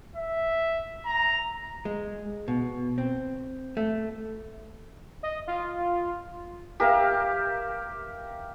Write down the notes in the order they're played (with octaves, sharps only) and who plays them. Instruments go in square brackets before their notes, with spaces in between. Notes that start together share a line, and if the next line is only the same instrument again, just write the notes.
[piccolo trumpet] E5
A#5
[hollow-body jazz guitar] G#3
B2
C4
A3
[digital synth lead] D#5
F4
[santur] G4 A#4 E5 F5